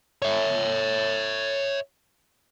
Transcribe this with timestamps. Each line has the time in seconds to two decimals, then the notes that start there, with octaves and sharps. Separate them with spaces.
0.22 C#5 E5